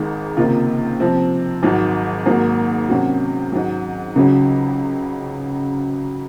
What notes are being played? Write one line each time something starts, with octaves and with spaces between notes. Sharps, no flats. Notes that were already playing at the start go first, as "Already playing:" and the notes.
Already playing: G#1 G#2 D#3 G#3 D#4
C#2 C3 D#3 A#3 F4
C3 F3 C4
G#1 G#2 F#3
G#1 G#2 F#3 A#3
C3 D#3 F#3 C#4 F#4
G#2 D#3 F#3
C#2 C#3 F#3 C#4